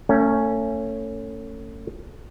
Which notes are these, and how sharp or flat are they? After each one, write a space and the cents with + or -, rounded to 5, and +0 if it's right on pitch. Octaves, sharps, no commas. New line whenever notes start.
A3 +35 C#4 +0